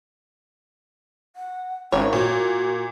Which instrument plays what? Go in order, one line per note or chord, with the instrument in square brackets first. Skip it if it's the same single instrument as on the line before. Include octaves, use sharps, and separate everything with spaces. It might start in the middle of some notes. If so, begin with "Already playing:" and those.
[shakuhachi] F#5
[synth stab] G#1 [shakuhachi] C#4 [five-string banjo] C#5
[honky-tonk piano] A#2 [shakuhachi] F#4